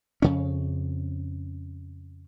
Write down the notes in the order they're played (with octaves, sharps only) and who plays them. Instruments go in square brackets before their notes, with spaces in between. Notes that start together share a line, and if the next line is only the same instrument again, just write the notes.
[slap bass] F2 C#3 C#4